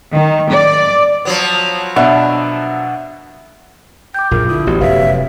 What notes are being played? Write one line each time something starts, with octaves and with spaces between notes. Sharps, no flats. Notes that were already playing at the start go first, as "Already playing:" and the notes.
D#3
D5
F3 F#3 B3
B2 D4 E5 F#5
G5 D6 G6
A#1 F#2 F4 A#4
D3 E4 D#6
A1 B3 F#4 G4
F1 F#2 B4 C#5 E5 F5